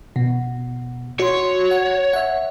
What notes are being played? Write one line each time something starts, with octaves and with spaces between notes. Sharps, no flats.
B2
F#4 C#5 C6
F#5
E5 F#5